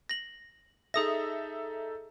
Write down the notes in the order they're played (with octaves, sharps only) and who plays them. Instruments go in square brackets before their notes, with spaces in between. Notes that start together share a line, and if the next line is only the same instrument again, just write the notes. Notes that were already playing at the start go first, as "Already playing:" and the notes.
[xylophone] A#6 F#7
[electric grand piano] D#4 A4 E5 [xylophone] G#4 D#6 A#6